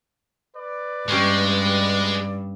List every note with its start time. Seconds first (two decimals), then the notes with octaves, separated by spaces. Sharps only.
0.55 B4 D5
1.09 G2 G#3 A#3 C#4 G4